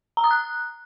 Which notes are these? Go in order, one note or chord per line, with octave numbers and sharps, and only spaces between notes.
A#5
D#6
F#6